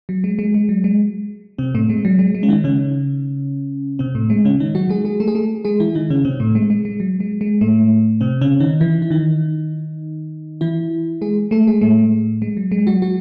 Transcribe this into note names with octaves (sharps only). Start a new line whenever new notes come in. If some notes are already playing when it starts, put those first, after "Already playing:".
F#3
G#3
G#3
G#3
F#3
G#3
C3 C4
A2 A3
G#3
F#3
G#3
G#3
C#4
D#3 D#4
C#3 C#4
C3 C4
A2 A3
G#3
C#3 C#4
D#3 D#4
F#3 F#4
G#3 G#4
G#3 G#4
A3 A4
G#4
A3 A4
G#3 G#4
E3 E4
D#3 D#4
C#3 C#4
C3 C4
A2 A3
G#3
G#3
G#3
F#3
G#3
G#3
A2 A3
C3 C4
C#3 C#4
D#3 D#4
E3 E4
E4
D#3 D#4
E3 E4
G#3 G#4
A3 A4
G#3 G#4
A2 A3
G#3
F#3
G#3
F#3 F#4
F#3 F#4